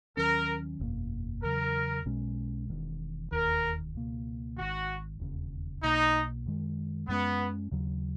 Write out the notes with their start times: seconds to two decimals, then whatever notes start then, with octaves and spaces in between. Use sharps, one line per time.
0.17 D#2 D#3 F#3 C#4 A#4
0.80 F#1 E2 B2 A#3
1.43 E2 C#3 F#3 A#4
2.06 B1 B2 G#3 C#4
2.69 E1 E2 D#3
3.31 E1 D#2 D#3 A#4
3.94 C#2 B2 A#3
4.57 G#1 G#2 D#3 F#4
5.20 E1 D#2 C#3
5.82 B1 B2 A#3 D#4
6.46 F#2 D#3 G#3
7.08 F#2 E3 G#3 B3 C#4
7.71 D#2 C#3 F#3